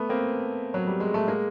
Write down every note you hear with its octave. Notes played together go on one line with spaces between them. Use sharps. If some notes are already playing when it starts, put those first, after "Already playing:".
Already playing: A3 B3
A#3 C4
F#3
G3
G#3
A3
G#3 A#3